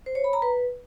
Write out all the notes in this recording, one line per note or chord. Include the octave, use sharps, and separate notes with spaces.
C5
C#5
B5
A#5
B4